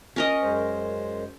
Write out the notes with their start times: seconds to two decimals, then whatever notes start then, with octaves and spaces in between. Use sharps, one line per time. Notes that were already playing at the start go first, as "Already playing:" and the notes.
0.16 C#4 A#4 D#5
0.42 F#2 G#3 C5